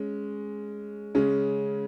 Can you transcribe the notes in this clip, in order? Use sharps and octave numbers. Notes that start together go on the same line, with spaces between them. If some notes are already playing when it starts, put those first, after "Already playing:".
Already playing: G#3 C#4
C#3 G#3 C#4